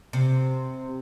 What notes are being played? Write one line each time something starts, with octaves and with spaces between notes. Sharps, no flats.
C3